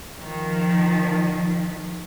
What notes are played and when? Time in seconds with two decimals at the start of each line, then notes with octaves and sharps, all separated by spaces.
0.19 D#3 F3